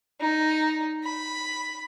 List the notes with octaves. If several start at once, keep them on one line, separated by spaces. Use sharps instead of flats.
D#4
B5